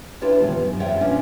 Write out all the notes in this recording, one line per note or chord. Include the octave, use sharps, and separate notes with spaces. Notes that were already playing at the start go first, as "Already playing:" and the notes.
D4 E4 F4 G4 B4 C#5
E2 G#2 B2 D#3
F#2
F2 F4 C#5 E5 F#5 G5
B2 F3 C#4 D4 F4